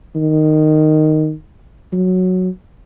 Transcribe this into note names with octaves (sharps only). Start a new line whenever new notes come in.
D#3
F#3